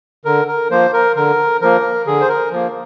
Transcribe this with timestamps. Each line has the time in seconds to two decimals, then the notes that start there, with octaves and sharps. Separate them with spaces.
0.25 D3 A#4
0.48 A#4
0.71 F3 A#3 C5
0.93 A#4
1.16 D3 A#4
1.61 F3 A#3 A#4
2.06 D3 G#4
2.21 C5
2.29 A#4
2.51 F3 A#3